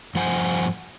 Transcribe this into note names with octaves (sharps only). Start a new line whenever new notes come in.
G2 F3 C5 F#5 G#5